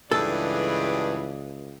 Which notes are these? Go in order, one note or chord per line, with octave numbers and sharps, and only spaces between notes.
C#2 G2 E3 G#4 A4 D5